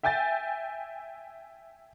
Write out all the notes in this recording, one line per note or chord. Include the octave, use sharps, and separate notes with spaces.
E5 G5 G#5 G6 A6